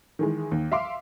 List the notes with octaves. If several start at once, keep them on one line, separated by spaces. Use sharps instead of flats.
D#3 E3 G#3
D#2
E5 F5 C6 D6